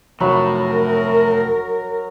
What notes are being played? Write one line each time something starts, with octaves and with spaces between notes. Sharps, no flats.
F1 A2 F#3 A#4 B5